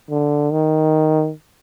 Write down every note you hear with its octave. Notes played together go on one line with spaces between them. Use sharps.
D3
D#3